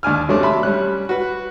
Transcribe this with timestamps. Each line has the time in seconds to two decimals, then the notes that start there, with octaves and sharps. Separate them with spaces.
0.03 D#2 D4 G#5 F6
0.29 C3 F#3 A3 C#4 D4
0.43 E5 A5 B5 C6
0.63 G3 C#4 F#6
1.09 F#4 B4